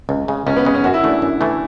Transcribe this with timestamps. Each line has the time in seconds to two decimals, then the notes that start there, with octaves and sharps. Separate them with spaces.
0.09 C#2
0.28 C#3 G#3
0.47 C#2 C#4
0.56 B3
0.65 C#3 G#3
0.75 C#4
0.84 F#2 F#4
0.94 E4
1.03 E3 A3 D4
1.13 E4
1.22 F#2
1.41 E3 A3